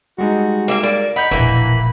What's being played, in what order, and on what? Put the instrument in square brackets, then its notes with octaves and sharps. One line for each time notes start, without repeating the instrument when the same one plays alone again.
[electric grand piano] G3 G#3 D#4 [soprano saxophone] F#4
[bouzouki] A#3 E5 F5
[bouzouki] A#3 [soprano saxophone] D5
[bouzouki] D#4 [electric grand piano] F#5 G6 [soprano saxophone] B5
[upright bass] E1 A#1 [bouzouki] E3 A#3